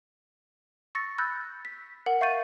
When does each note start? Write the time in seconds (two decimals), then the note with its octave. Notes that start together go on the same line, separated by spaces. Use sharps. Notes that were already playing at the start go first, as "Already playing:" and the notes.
0.95 C#6 E6 A6 A#6 C#7
1.18 B5 E6 F#6 G6 A6 A#6
1.65 B6
2.06 A#4 F#5 F#7
2.21 E5 F5 C#6 G6 A6 D#7